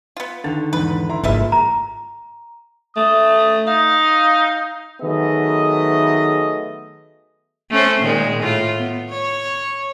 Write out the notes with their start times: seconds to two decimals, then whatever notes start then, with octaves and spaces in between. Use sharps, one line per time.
0.17 B3 F4
0.44 D3 D#3 A6
0.73 E2 G#2 B4
1.09 E4 A#5 C6
1.24 G#1 F3 G3 G#3 A#3 B4 E5
1.52 A#5
2.96 A3 D#6
3.67 D#4 F5
5.02 D#3 F#3 A3 B3 G#4 D#5
7.71 A3 C#4 C5
8.01 A#2 D#3 G#3
8.40 A2 F4
8.79 B3
9.09 C#5